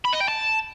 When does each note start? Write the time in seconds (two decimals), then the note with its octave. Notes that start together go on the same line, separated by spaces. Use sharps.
0.05 B5
0.13 D#5
0.21 G5
0.28 A5